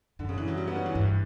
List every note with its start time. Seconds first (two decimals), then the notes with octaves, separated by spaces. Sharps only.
0.19 F#2 D3
0.29 C#3
0.38 E3
0.48 F#3
0.57 G3
0.67 B3
0.76 C#4
0.86 E3
0.95 G2